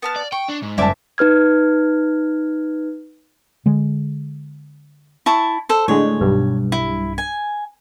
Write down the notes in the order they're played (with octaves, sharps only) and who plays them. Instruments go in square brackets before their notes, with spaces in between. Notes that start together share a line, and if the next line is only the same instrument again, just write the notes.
[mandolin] B3 A5 F6
[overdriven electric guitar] D5
[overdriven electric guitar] G5 [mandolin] C#6
[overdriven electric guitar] D4
G#2
[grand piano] F#1 A5 [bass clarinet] G3 [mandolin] E5 G#5 D6
[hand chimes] D#4 B4 F6 G#6
[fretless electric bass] D3 G#3
[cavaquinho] E4 A5 C#6
A4 C5
[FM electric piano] A2 D3 G#3 [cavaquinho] C#5
[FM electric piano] B1 G2
[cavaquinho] E4
G#5